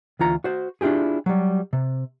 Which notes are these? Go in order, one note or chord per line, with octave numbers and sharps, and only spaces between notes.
D2 E3 F4 A#5
F#4 C5
D4 E4 F4 G4 G#4
F#3 G3
C3